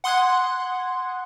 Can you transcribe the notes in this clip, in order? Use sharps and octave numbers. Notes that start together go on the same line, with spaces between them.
F#5 C6 D#6 F#6 G#6